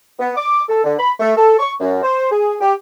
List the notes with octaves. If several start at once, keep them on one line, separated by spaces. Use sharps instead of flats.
B3
D6
A4
D3
B5
A3
A4
C#6
F#2
C5
G#4
G4